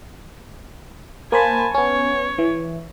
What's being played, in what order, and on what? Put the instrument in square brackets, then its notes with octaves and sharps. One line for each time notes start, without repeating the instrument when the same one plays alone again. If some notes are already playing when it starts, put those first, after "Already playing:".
[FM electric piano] A#3 C5 B5 [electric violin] G#5 A5
[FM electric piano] B3 C#4 [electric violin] C#5
[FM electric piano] E3